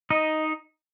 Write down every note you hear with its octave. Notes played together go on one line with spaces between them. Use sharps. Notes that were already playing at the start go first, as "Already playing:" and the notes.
D#4 D#5